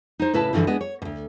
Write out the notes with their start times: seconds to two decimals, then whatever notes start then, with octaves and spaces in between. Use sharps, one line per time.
0.19 D#4 C5
0.33 A2 C#3 E4 B4 E5 A5
0.53 G2 D3 E3 F3
0.67 G#3 B3 D4 D#5
0.81 C#5
1.02 D2 B2